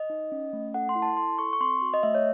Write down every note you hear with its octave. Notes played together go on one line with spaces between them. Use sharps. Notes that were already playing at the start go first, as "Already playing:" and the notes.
Already playing: D#5
D#4
C#4
A3
A4 F#5
C6
E4
A5
A4 C6
A4 C#6
C#6
C4 C6
F#4
D#5
A3 E5
C#5